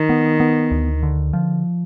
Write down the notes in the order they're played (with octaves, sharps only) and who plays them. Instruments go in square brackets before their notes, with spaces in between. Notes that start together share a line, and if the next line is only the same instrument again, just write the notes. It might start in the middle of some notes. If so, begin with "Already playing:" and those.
Already playing: [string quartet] D#3
[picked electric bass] B3
B3
D2
D3
F3